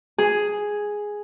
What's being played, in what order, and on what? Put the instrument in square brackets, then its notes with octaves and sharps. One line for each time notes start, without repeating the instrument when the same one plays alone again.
[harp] G#4